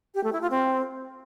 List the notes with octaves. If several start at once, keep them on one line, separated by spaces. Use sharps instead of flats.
G4
A3
E4
F4
C4